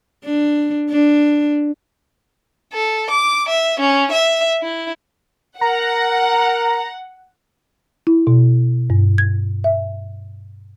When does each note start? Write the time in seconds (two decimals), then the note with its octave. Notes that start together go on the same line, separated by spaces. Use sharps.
0.24 D4
0.90 D4
2.73 A4
3.11 D6
3.49 E5
3.80 C#4
4.12 E5
4.62 E4
5.61 A#4 F#5 A#5
8.07 E4
8.27 B2
8.90 G2
9.18 G#6
9.64 E5